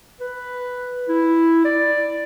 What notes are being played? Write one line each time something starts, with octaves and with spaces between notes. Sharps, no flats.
B4
E4
D5